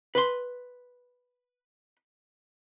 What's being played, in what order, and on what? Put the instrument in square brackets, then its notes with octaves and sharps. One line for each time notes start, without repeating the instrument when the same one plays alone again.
[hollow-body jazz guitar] B4 C6